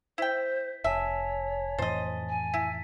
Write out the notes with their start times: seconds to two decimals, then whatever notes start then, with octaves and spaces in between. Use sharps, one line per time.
0.18 E4 C5 G5 B6
0.84 F1 C#5 E5 G#5 A5 B6
1.79 F2 A2 E3 C5 D#5 A6
2.29 G#5
2.54 E4 B6